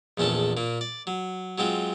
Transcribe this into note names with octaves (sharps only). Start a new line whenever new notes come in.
A#1 E2 C#4 D4 A4
A#2 A#3
D5
F#3
F#3 G#3 C4 F4